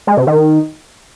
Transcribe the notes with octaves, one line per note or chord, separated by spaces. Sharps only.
G#3
C3
D#3